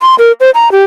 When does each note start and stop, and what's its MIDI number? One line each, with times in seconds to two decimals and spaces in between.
0.02 0.15 84
0.18 0.32 70
0.40 0.50 72
0.54 0.71 82
0.72 0.84 67